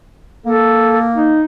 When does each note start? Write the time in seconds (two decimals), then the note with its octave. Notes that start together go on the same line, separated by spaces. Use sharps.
0.46 A#3 A4
1.15 D#4